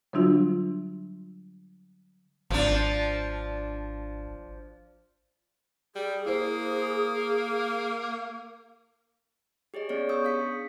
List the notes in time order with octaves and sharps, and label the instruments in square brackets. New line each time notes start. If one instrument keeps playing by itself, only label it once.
[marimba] D3 F#3 G3 D4 F4 F#4
[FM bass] G#1 [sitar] F3 D4
[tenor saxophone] G3 [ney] G#4
[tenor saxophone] A#3 [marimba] E4 C5
[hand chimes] G4 G#4 C#5 D#5
B3 C#4 G#4 C#5 D5
C#6 D#6 E6 G6
D4 F5 B6 C#7
G#4